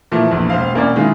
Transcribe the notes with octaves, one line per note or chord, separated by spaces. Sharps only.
A#2 E3 F3 A3
A#1 E2
E1 C5 F5
E1 A#3 C#4 D5
D#3 G#3 C#4 E4 F4